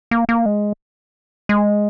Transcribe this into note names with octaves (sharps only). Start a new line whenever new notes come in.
A#3
A#3
G#3
G#3